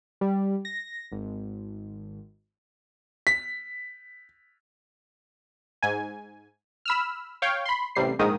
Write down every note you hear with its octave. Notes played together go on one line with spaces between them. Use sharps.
G3
A#6
G#1
B6
G#2 G#5
B5 E6 F6
C#5 F5 G5
B5 C6
A1 C3 G3 C7
A#1 G#2 D#3 G#3 D#6